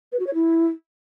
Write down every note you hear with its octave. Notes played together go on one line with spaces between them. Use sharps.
B4
F#4
C#5
E4